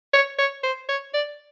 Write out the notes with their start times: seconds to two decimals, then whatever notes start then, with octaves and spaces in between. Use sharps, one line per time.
0.13 C#5
0.39 C#5
0.63 C5
0.89 C#5
1.14 D5